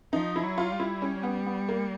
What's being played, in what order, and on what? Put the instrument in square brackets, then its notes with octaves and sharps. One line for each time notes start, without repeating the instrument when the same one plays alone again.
[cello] F3 [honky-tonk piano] D#4
[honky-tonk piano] E4
[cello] F#3
[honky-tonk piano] F4
[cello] G3
[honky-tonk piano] E4
C#4
B3
B3
A#3